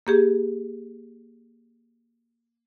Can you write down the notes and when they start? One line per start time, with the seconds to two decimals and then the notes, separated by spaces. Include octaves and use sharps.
0.07 A#3 G4 G#4